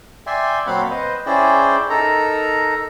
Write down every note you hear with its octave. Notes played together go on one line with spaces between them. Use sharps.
D5 E5 G5 G#5 C6
A#2 F#3 C4 F5 F#5 B5
B4 C5 D#5
C#4 E4 G#4 C5 D5 G5
D#4 A4 A#4 A#5